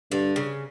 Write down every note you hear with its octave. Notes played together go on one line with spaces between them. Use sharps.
G2 D3
C#3